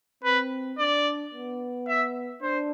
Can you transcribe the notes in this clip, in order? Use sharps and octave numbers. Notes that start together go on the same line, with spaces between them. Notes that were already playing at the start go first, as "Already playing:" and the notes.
C4 B4
D4 D5
B3
E5
D4 C5